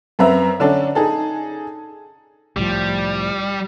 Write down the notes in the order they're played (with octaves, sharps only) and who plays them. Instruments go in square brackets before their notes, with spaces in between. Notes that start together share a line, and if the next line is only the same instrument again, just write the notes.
[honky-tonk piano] F#2 C4 B4 E5 A#5
D3 C#4 D4 A4
D#4 G#4 A4
[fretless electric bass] C2 A2 F3 [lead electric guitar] G3